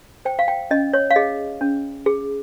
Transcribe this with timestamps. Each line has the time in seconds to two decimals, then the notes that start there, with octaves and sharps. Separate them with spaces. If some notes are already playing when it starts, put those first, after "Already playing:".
0.25 C5 G5
0.39 F5
0.48 G5
0.71 C#4 D#5
0.93 C#5
1.11 F5
1.16 G#4 D#5
1.61 C#4
2.06 G#4